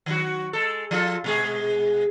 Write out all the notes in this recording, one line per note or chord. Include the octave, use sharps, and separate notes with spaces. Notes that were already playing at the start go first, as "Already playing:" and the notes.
D#3 F#3 F#4
G#3 A4
F3 F4 A4
B2 G#3 G#4